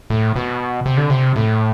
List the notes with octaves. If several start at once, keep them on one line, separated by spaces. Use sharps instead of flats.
A2
B2
C3
D3
C3
A2